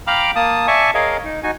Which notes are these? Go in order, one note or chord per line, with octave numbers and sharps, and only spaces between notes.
F5 G5 A#5 B5 D6 F6
A#3 A5 D#6
D5 E5 G#5 A5 C#6
G#4 A#4 C#5 D#5 F5
D#4
D#4 F#4 G#5